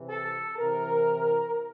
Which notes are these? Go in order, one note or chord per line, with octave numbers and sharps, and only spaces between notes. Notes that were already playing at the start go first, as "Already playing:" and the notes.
Already playing: C3 E3
A4
C3 E3 A#4